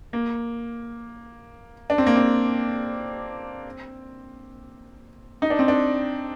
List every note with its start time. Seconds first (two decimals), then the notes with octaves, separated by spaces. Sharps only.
0.13 A#3
1.90 D4
1.98 C4
2.07 A#3
2.15 C4
5.42 D#4
5.50 D4
5.59 C4
5.68 D4